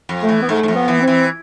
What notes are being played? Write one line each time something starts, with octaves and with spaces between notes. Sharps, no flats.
F2
A3
E3
B3
G#2 A3
G#2
F2
B3
E3
C4
E3